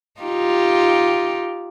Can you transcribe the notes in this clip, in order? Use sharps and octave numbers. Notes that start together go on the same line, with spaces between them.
D#4 F4 G4